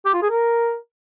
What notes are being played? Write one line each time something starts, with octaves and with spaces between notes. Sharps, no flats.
G4
F4
G#4
A#4